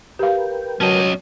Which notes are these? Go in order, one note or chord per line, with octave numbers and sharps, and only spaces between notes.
G4 A#4 B4 F5 G5
F#3 C#4 D#5 A5